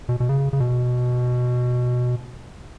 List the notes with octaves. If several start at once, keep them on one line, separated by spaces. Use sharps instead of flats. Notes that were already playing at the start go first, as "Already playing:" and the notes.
B2
B2
C#3
C#3
B2